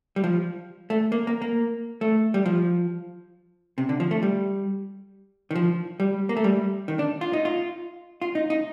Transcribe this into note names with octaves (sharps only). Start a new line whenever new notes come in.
G3
F3
A3
A#3
A#3
A#3
A3
G3
F3
C3
D3
F3
A3
G3
D#3
F3
G3
A#3
A3
G3
D#3
D4
F4
D#4
F4
F4
D#4
D#4